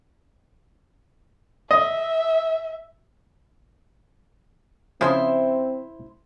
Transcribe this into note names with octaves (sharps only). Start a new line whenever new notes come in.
D#5 E5
C#3 F3 C4 E4 G#4 C5 E5